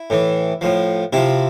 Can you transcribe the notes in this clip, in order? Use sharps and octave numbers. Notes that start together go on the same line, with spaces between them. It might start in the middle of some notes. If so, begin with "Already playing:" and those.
Already playing: E4
A2 E3
A2 F3
C3 F3 E4